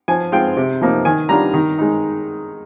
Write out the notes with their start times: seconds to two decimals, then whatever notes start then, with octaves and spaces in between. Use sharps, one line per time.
0.08 F3 G#5
0.32 G#3 C4 F4 G5
0.57 C3
0.81 F3 A#3 D#4
1.05 D#3 G#5
1.29 G3 D4 F4 A#5
1.54 D#3
1.78 G#3 D#4